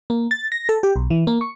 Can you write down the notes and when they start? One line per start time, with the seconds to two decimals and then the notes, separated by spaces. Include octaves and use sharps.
0.10 A#3
0.31 A6
0.52 A#6
0.69 A4
0.83 G4
0.96 B1
1.10 E3
1.27 A#3
1.41 C#6